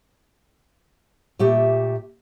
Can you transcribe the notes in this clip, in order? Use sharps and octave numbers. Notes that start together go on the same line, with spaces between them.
A#2 A3 G4 E5